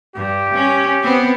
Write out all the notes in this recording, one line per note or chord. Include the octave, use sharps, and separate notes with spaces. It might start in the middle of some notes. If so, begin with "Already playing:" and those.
G2 G4
C#4
B3 C4